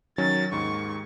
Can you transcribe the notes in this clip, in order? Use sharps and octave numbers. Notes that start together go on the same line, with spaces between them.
D#3 F#3 C#4 A6
D#2 G#2 D#3 C#6